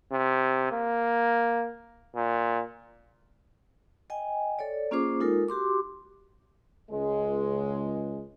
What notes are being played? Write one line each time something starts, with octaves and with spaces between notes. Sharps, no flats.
C3
A#3
A#2
D#5 G5 G#5
A4 C#5 D5
A#3 C#4 F4 G#4 C5 D6
G#3 D#4 F4 A4 A#4
F#4 G4 C6 D6
C#2 G#3